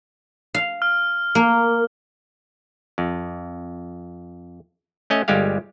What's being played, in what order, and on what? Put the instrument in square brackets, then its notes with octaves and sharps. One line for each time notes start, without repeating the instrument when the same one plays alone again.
[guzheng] F5
[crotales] F6
[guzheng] A#3
[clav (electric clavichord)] F2
A3 C#4 D#5
G1 G3 G#3 G4 F5